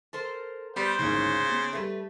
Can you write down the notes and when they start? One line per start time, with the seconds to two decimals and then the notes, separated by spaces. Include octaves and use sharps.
0.13 A4 A#4 C5
0.76 G3 B3 B4 C5
0.99 D1 G#1 A#2 C#3 C#4
1.49 B3
1.73 G3 A3 B4 E5 A6